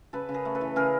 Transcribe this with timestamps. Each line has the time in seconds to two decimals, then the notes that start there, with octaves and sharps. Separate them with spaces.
0.13 C#3 A4 B4
0.29 C#3
0.34 G#4 A#4
0.45 A3
0.55 A4 B4
0.61 E3
0.76 C#3 G#4 A#4